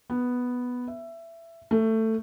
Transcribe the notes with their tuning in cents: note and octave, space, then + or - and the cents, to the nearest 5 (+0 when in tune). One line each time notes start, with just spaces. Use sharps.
B3 +0
E5 +15
A3 +15